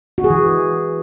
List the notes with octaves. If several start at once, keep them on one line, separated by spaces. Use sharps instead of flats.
F#4
G#4
E3